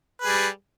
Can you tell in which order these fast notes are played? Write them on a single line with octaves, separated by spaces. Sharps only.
B4 G#4 G3